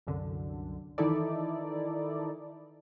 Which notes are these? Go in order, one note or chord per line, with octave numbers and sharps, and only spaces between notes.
C2 F#2 D3
D#3 E3 D#4 E4 A4 D5